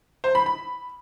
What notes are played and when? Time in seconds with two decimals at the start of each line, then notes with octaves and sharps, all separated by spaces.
0.24 C5
0.35 B5
0.46 B5